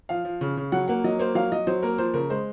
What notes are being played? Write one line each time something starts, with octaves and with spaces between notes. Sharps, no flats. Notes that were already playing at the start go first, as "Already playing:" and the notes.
F3 F5
F3
C#3
C#3
F#3 F#5
A#3 F#5
F#3 D#5
A#3 C5
F#3 F5
F#3 D#5
F#3 C5
A#3 A#4
F3 C5
C#3 A#4
G#3 C5